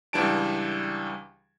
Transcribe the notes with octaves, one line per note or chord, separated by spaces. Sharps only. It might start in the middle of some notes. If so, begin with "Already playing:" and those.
C#2 E3 G3 D4 A5 D7